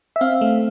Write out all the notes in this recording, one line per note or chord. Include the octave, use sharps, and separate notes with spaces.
E5
C4 F5
A3